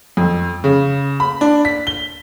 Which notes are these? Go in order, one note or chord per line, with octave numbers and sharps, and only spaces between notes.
F2
C#3
B5
D4
B6
G7